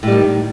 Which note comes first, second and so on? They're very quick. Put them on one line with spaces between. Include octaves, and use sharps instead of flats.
A2 G3 D#3